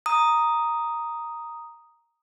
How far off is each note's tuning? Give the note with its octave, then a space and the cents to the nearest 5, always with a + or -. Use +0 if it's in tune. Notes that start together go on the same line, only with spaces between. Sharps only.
A#5 +0 D#6 +0